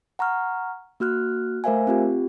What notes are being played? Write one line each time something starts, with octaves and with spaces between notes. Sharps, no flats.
F#5 A#5 C#6 F6
A#3 F#4 F6 F#6
A3 A#4 C5 E5 F5 G#5
C4 F4 G4